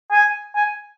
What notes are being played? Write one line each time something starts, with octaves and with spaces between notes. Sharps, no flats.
G#5
G#5